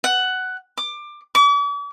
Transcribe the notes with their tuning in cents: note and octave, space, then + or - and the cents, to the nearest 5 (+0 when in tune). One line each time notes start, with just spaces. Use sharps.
F#5 +10
D6 +20
D6 -45